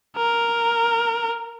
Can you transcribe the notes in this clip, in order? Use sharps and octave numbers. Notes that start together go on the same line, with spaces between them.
A#4